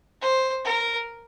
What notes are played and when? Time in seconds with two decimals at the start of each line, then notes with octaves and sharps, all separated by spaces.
0.21 C5
0.64 A#4